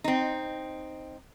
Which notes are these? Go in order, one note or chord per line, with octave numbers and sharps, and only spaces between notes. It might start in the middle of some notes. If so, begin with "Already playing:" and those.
C4 D#4